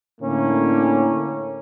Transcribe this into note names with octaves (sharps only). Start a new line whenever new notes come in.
A2 D3 A#3 C#4